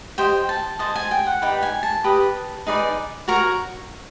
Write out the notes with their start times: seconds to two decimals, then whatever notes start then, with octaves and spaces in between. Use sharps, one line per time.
0.18 G4 C5 D#5 G5
0.49 A5
0.79 G#4 C5 D#5 A5
0.96 G#5
1.11 G5
1.26 F#5
1.42 D#4 G4 B4 D5 G5
1.62 G#5
1.83 A5
2.04 G4 B4 D#5
2.67 D#4 G#4 B4 D5
3.28 F#4 A#4 C#5 A#5